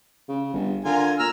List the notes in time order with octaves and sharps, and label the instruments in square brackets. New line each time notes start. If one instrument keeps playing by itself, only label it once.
[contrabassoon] C#3
G1
[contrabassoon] D3 [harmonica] F4 A#4 G#5
[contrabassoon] A#2 [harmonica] A#5 E6 F6